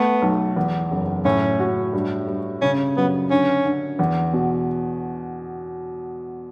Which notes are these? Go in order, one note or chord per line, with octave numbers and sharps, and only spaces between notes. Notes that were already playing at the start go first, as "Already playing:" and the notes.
Already playing: A3 B3
B1
E2
F#1
A2 C#4
F#4
G2
G2
C#3 C#4
F#2 B3
D3 C#4
D3
E2
B2